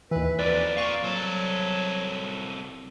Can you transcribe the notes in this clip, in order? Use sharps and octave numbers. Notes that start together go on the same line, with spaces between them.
D#2 E3 B4
F2 A#2 B4 D5
A#2 F5 C#6
C2 F#3 A4